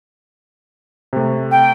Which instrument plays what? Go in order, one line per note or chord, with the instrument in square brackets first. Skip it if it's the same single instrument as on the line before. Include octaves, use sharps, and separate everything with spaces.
[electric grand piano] C3 A3
[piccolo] G5